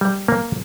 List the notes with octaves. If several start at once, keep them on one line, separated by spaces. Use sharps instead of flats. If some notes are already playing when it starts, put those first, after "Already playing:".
G3
A#3